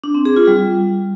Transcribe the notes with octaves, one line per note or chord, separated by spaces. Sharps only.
D4
C4
G#4
F4
G3